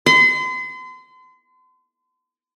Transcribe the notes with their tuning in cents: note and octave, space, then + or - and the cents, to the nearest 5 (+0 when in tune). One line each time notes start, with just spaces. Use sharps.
C6 -40